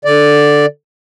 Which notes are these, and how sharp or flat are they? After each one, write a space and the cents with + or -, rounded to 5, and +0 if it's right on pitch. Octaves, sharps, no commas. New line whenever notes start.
D3 +0 D5 +0